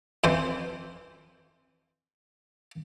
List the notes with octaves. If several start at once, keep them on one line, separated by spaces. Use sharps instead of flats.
F2 E3 C5